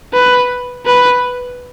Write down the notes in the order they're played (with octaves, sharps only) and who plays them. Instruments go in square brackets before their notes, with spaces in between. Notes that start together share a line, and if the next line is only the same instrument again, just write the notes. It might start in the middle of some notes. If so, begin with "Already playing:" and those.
[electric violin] B4
B4